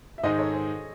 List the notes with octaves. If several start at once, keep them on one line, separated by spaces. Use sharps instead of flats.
E5
G#2 D#3 G#3 D#4 C5 D#5
A4 C#5
G#4 C5